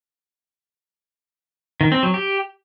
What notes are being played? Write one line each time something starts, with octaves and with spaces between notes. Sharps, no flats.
D#3
C4
F#3
G4